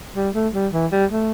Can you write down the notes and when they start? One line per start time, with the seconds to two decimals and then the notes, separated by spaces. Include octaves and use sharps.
0.16 G3
0.35 A3
0.54 G3
0.73 E3
0.92 G3
1.11 A3